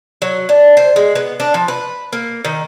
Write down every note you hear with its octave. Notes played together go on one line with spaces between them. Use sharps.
F#3
D4
C5
G#3
B3
D4
F3
B4
A#3
D#3